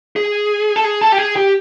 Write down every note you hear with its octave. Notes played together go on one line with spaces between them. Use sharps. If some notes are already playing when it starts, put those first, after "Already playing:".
G#4
A4
G#4
A4
G4
G#4
G4